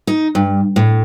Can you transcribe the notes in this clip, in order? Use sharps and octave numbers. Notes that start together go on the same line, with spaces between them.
D#4
G2
A2